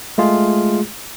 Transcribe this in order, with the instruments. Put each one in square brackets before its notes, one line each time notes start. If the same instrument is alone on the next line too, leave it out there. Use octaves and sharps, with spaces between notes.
[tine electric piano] G#3 A3 F4 G#4